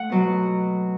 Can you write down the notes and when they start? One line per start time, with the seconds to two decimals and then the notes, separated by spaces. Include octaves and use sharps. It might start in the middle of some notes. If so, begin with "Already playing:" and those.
Already playing: A3 F#5
0.10 B2 F#3 B3